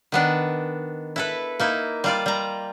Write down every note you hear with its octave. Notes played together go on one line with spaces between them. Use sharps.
D#3 B3 D4
E4 A4 B4
A#3 D#4 E4
G3 F4 D5
G3 A#5